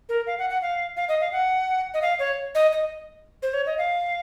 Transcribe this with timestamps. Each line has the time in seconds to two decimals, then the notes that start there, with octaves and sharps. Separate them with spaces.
0.09 A#4
0.27 F5
0.39 F#5
0.50 F#5
0.62 F5
0.97 F5
1.09 D#5
1.20 F5
1.32 F#5
1.94 D#5
2.02 F5
2.19 C#5
2.55 D#5
2.72 D#5
3.43 C5
3.54 C#5
3.66 D#5
3.78 F5